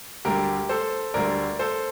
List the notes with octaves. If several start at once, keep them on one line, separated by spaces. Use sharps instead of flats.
D2 D3 G3 G4 A#4
A4 C5
D2 D3 G3 A#4 D5
A4 C5